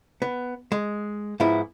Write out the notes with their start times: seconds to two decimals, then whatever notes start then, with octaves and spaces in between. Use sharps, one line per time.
0.22 B3
0.72 G#3
1.40 G#2 F3 B3 E4